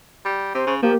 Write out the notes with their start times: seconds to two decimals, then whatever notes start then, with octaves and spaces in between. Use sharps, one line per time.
0.25 G3
0.55 C3 C5
0.67 C#3
0.82 F3 A#3 G4